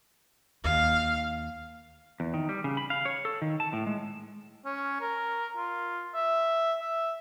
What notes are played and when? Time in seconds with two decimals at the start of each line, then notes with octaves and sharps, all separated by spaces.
0.64 D#2 F5
2.20 E2
2.34 D#3
2.49 G3
2.64 C#3
2.77 B5
2.90 F5
3.05 C#5
3.25 A4
3.42 D#3
3.60 A5
3.73 A2
3.86 G#3
4.66 C#4
5.01 A#4
5.57 F4
6.15 E5
6.81 E5